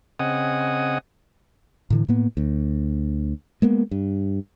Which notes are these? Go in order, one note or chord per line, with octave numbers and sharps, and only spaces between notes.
C#3 C4 D#5 F#5 G#5 D#6
A2 D3 E3
A2 A#3 B3
D2
G#3 A#3 B3
G2